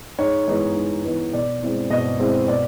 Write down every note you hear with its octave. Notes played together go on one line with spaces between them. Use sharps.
G#2 C#5
E3 G#3 B3 D#4
G#2
E3 G#3 B3 D#4
B2 D5
G#3 C4 E4
B2 D#5
G#3 C4 E4
B2 D5